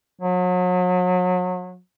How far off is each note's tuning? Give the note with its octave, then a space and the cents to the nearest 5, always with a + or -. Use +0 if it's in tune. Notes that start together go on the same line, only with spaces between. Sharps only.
F#3 -35